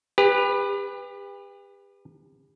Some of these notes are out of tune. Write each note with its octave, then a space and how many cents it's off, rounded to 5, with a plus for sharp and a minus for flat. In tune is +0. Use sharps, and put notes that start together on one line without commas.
G4 +40 B4 +0